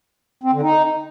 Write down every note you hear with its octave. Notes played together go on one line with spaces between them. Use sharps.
C4
D3
D#4